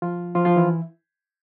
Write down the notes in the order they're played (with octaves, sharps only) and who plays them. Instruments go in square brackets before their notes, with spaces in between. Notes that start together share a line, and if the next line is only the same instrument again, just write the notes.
[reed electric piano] F3 F4
F3 F4
F3 F4
E3 E4